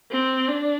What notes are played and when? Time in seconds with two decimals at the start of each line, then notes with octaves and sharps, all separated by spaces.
0.11 C4
0.49 D4